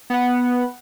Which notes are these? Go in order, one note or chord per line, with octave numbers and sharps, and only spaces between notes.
B3 F#5